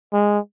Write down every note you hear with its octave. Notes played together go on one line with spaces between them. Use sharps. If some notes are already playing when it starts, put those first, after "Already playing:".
G#3